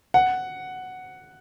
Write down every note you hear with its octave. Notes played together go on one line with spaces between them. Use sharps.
F#5